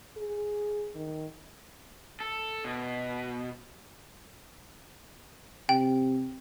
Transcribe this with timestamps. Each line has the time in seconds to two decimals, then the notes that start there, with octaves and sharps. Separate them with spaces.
0.17 G#4
0.95 D#3
2.20 A4
2.64 B2
5.69 C3 G5